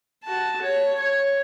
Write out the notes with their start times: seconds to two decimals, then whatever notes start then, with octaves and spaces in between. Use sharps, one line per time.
0.24 F#4 A5
0.62 C#5
0.99 C#5